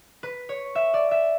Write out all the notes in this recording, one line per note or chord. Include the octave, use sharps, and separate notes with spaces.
B4
C#5
E5
D5
E5